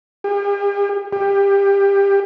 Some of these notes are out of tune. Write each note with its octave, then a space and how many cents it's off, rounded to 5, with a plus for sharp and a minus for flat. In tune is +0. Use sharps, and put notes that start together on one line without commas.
G4 +45
G4 +20